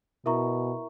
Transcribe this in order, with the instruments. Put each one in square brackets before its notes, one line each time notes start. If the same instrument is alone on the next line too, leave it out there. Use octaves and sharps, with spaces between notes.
[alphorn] B2 [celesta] E4 A#4 E5 A#5 C#6